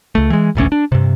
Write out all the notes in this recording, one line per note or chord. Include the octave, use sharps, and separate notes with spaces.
C#2 A3
E3 G#3
E1 A1 D2 C#4
D4
G2 C3